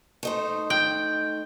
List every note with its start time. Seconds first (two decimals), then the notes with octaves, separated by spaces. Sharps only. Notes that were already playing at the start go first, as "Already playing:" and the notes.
0.23 A3 D#4 C5
0.70 G5